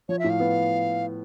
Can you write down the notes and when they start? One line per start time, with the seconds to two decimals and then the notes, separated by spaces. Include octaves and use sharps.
0.09 F3 C#5
0.19 E5
0.24 A2
0.30 F5
0.40 B3